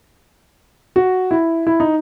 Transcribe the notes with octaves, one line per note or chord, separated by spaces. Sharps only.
F#4
E4
E4
D#4